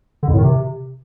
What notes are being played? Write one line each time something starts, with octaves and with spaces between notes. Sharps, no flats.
D3
F2
A2
D#3
C3